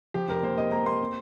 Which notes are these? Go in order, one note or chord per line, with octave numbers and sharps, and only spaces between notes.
F3 G4
F1 A#4
A#3 C5
A#3 D#5
A#3 A#5
A#3 C6
C4